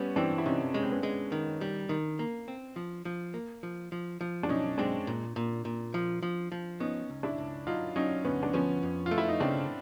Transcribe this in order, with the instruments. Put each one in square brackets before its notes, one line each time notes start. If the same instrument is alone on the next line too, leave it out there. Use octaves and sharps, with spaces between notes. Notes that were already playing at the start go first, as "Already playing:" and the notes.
Already playing: [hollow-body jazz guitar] G3 [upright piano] B3 C#4
[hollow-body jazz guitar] E3 [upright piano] C4 D4
[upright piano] E4
[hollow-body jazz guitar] C3 [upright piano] C#4 D#4
[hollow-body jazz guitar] G#3 [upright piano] C#4
[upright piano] C4
B3 C#4
[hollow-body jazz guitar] G#3
D#3
G3
D#3
A#3
C4
F3
F3
A#3
F3
F3
F3
[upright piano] D4
[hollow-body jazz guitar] B1 [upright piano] C#4 D#4
[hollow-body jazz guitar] G#3 [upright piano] C4 D4
[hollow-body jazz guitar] A#2
A#2
A#2
F3
F3
F3
[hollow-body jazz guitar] B3 [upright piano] C#4 D#4
[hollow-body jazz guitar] C#2
[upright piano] D4 E4
[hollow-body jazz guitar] C#2
[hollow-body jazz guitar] F#3 [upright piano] D#4 F4
[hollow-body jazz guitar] F#3 [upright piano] C#4 D#4
[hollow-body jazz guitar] D2 [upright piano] B3 C#4
[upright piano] D4
[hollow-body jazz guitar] F3 [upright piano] B3 C#4
[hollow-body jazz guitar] F2
[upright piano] F4
[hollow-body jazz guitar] A3
[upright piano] E4
D#4
[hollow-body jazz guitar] C#3 [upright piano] C4 D4